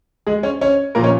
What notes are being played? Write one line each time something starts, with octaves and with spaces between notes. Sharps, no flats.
G#3 G#4
C#4 C#5
C#4 C#5
A#2 F3 A#3 A#4
C#4 C#5